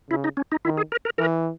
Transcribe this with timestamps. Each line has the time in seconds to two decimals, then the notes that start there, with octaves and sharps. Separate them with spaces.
0.10 C#3 E4
0.24 D#4
0.37 C#4
0.52 D#4
0.65 D#3 E4
0.77 G#4
0.92 A#4
1.05 A#4
1.18 E3 A#4